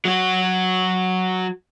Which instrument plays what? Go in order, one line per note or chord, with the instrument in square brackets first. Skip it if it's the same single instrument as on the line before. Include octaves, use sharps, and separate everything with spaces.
[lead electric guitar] F#3 F#4